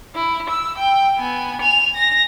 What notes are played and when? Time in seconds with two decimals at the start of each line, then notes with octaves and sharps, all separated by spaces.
0.15 E4
0.50 E6
0.78 G5
1.18 B3 G#5
1.60 G#5 F7
1.96 A#6